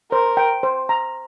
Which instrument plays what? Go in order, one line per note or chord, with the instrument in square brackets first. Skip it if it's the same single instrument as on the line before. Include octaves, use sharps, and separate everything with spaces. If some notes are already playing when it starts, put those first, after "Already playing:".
[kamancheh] A#4 [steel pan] C5
[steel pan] G5
C5
A#5